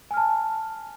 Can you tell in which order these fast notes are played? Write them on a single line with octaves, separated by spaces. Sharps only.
G#5 F6 A5